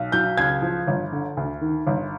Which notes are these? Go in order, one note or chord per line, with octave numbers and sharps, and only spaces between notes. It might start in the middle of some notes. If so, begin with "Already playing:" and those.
Already playing: B1
F#3 G6
C#2 G#6
F3
G1
D3
D2
D#3
G1